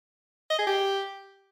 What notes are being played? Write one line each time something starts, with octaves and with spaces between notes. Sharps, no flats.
D#5
G#4
G4